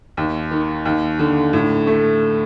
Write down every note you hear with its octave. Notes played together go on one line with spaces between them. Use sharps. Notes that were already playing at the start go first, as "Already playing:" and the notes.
D#2
D#3
D#2
D3
A2
A3